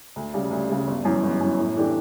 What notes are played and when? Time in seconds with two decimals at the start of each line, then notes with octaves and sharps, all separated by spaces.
0.16 D2
0.34 C#3 G3
0.51 D2
0.70 C#3 G3
0.87 G1
1.05 F#2 E3
1.23 G1
1.41 F#2 E3
1.59 A2
1.76 E3 A3 D4 G4